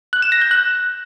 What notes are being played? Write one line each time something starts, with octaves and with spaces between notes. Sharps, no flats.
F#6
E7
A#6
G6
F#6